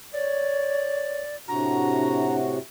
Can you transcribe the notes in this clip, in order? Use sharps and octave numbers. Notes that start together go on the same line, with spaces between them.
C#5 D5
A2 C3 D4 F#4 A#5